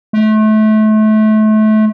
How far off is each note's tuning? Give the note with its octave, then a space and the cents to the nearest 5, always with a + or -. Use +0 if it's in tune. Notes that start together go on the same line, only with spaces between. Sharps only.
A3 -30